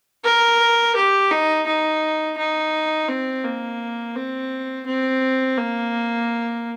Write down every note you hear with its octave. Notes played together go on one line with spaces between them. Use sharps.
A#4
G4
D#4
D#4
D#4
C4
A#3
C4
C4
A#3